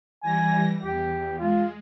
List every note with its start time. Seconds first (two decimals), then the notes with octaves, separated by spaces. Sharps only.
0.22 E3 G3 G#5 A#6
0.82 E2 G4
1.38 G#3 F4